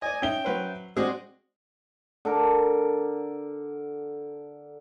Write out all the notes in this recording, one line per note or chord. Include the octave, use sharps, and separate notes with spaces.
D5 D#5 G#5
C#4 D#4 E5 G5 G7
F#3 B4 C5
G#3 C4 D4 F#4 G#4 C5 D#5
D3 A4 A#4